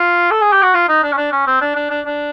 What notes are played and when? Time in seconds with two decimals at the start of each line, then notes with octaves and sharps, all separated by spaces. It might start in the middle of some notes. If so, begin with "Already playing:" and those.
Already playing: F4
0.31 A4
0.42 G#4
0.52 G4
0.63 F#4
0.74 F4
0.89 D#4
1.03 D4
1.12 C#4
1.17 D4
1.32 C#4
1.47 C4
1.61 D4
1.76 D4
1.91 D4
2.06 D4